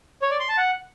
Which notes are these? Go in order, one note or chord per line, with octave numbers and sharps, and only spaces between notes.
C#5
D5
C6
A5
F#5